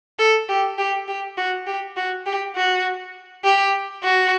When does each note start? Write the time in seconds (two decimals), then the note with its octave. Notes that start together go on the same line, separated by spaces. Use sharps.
0.19 A4
0.49 G4
0.78 G4
1.08 G4
1.37 F#4
1.67 G4
1.97 F#4
2.26 G4
2.56 F#4
3.45 G4
4.04 F#4